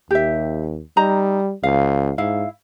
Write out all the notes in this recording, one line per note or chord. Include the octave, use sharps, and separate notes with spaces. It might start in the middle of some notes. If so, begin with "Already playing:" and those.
D#2 G4 E5
G3 D#4 A#5
C#2 F5
G#2 E4 F5